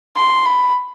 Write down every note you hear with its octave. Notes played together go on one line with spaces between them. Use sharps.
C6
B5